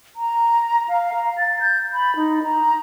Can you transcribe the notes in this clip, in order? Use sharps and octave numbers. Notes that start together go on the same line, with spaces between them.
A#5
F5
A#5
A6
G6
B5
D#4
A#5